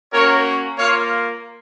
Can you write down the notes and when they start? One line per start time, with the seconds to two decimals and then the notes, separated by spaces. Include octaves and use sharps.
0.12 A#3 C#4 F#4 A#4 C#5
0.77 A#3 F4 C#5 F5